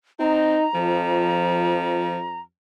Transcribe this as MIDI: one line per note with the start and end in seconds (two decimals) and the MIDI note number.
0.20 0.58 60
0.20 0.66 63
0.20 2.40 82
0.75 2.44 41
0.75 2.19 53